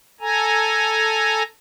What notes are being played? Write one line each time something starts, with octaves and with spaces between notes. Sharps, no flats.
A4 G#5 A#5